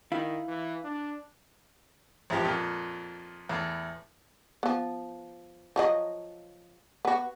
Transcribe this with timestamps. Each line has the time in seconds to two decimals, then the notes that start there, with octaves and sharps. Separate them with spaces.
0.12 D#3 E4 F5
0.48 E3
0.84 D4
2.30 A1 F#2 F3 G4
2.44 F2 A#2
3.49 E2 A2
4.63 F3 B3
5.76 F3 F#3 D#5
7.05 B3 F#4